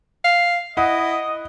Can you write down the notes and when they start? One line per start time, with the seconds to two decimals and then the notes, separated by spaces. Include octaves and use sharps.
0.24 F5
0.77 E4 D#5 F#5